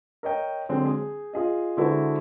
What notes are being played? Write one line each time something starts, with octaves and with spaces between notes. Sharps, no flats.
A#4 C#5 D#5 G5
D3 F#3 G#3 C4 G#4
G#4
F4 G#4 D#5
D3 G#3 E4 F#4 A4 C5